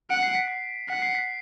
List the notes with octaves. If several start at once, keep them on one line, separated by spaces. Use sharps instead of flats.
F#5 D7
C7
B6
C7
F#5 B6
C7
B6